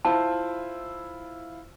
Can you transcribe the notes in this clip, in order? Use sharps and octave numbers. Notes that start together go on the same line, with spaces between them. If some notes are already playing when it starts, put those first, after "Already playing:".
E4 F4 C5 A5